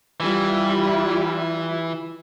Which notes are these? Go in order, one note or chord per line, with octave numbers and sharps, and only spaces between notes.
E3 G3 E4 F4